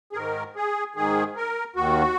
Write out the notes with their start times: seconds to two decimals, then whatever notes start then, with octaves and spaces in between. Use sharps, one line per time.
0.13 G#4
0.16 G#2 D#3 A#4
0.56 G#4
0.96 G#2 D#3 G#4
1.36 A#4
1.76 D#2 D#3 F#4